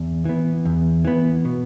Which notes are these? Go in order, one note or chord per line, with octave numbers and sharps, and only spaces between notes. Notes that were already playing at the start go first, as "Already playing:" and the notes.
Already playing: E2
E3 B3
E2
E3 B3
B2